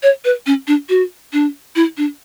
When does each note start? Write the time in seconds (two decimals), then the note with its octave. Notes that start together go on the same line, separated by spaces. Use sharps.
0.03 C#5
0.25 B4
0.46 C#4
0.68 D4
0.89 F#4
1.33 D4
1.76 E4
1.97 D4